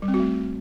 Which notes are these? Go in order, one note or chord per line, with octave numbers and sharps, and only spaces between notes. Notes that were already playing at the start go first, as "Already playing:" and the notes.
G3
C4
F#4
A3